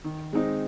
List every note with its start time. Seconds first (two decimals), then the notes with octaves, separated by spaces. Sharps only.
0.04 D#3
0.33 G#3 C4 D#4